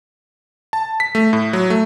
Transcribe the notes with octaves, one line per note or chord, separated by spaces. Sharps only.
A5
B6
A3
A2
F#3
A3